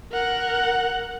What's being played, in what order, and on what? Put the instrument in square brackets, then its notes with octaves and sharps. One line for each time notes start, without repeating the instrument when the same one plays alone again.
[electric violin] A#4 F#5